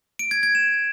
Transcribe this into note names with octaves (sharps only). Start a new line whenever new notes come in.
D7
G#6
G#6
E7